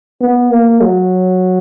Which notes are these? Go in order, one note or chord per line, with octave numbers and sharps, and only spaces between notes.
B3
A#3
F#3